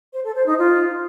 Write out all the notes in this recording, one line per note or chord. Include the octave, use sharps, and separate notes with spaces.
C5
A4
C5
D#4
F4